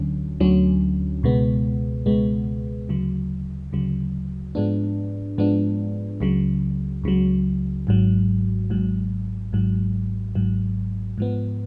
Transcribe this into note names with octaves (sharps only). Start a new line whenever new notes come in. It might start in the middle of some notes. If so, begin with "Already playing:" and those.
Already playing: D2 D3 F#3 C#4
D2 D3 F#3 C#4
C#2 B2 G#3 B3
C#2 B2 G#3 B3
D2 C#3 F#3
D2 C#3 F#3
G#2 F3 G#3 B3 D4
G#2 F3 G#3 B3 D4
C#2 C#3 F#3
C#2 C#3 F#3
G#1 G#2 F#3
G#1 G#2 F#3
G#1 G#2 F#3
G#1 G#2 F#3
G#2 F3 B3